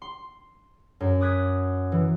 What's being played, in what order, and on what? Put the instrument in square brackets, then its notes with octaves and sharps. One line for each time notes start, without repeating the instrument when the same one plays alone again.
[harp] C6
F#2
D6 D#6 F#6 G#6 B6
E3